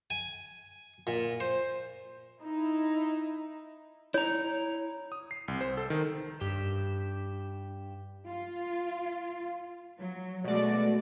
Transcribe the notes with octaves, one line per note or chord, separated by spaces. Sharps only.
G#5
A#2
C5
D#4 E4
E4 C#5 A#5
D#6
C7
C2
C5
A4
D#3
G2 G4 G6 B6 E7
F4
F#3
B2 G#3 A3 F#4 D5